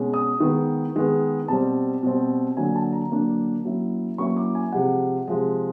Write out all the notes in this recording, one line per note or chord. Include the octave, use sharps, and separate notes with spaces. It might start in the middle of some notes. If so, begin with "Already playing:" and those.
Already playing: B2 G#3 C#4
D#6
D#3 G#3 B3
D#3 G#3 B3
B2 G3 C4 A5
B2 G3 C4
D3 F#3 A#3 D4 G#5
A5
A#5
D3 F#3 A#3 D4
F#3 A#3 C#4 E4
F#3 A#3 C#4 E4 C#6
D6
G#5
C3 F3 G#3 F#5
C3 F3 G#3